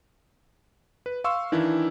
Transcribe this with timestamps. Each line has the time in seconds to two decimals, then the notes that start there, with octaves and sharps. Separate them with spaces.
1.06 B4
1.24 F5 C6 C#6 E6
1.52 D#3 E3 D4 E4